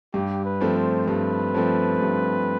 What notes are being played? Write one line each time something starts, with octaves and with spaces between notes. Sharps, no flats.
G2 G4
B4
F3 A3 C4
C5
G2 B4
F3 A3 C4
G2